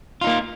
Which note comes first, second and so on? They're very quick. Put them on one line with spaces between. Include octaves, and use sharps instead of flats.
F4 D#4 A#3